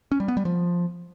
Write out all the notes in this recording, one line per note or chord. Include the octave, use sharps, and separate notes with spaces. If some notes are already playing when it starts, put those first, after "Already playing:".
C#4
G3
B3
G3
F3